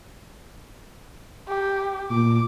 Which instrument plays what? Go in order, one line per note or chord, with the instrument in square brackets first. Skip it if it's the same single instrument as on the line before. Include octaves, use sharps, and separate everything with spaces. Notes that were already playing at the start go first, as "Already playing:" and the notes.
[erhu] G4
[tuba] A#2 [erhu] D6